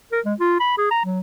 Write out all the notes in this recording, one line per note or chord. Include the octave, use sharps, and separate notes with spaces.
A#4
G#3
F4
B5
G#4
A#5
F#3